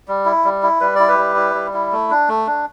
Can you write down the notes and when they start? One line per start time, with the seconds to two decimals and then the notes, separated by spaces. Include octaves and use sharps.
0.08 G3
0.26 E4
0.45 G3
0.63 E4
0.81 G3 B4
0.96 E4 D5
1.08 G4 B4
1.18 G3
1.36 E4
1.55 G3
1.74 E4
1.92 A3
2.11 D4
2.29 A3
2.47 D4